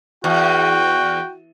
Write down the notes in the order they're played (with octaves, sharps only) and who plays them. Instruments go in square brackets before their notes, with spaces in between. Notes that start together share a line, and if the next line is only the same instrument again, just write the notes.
[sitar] E2 [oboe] F#4 [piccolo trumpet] G5